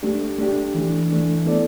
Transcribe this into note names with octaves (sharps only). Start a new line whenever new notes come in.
A3 D4 G4
A3 D4 G4
E3 A3 D4
E3 A3 D4
B3 E4 A4 D5